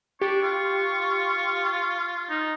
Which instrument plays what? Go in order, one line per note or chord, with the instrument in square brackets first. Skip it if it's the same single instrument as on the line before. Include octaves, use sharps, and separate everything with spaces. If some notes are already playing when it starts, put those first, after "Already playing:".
[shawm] D4 [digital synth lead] G4 [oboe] C#6
[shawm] F4
[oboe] D#4